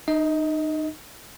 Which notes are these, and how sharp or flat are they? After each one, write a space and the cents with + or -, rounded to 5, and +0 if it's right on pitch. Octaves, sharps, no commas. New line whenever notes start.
D#4 -25 D#5 +25